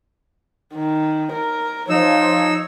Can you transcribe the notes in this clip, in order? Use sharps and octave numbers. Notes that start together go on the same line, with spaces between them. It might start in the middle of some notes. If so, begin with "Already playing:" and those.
D#3
A#4
F3 D#4 C#5 E6